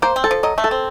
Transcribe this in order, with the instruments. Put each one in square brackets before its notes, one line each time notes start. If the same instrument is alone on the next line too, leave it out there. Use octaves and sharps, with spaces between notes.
[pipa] A#3 [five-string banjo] C5
[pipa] C4
[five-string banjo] A4
[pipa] F3
[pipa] F#3 [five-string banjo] D#5
[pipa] A3
[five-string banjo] A4
[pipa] C4